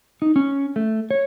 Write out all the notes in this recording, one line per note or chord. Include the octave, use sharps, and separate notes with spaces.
D#4
C#4
A3
C#5